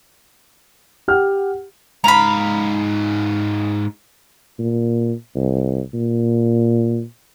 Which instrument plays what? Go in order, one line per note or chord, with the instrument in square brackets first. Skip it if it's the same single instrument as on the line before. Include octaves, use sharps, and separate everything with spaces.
[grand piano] G4 F#5 F6
[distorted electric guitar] G#2 F5 [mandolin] A#5 B5
[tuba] A#2
C2
A#2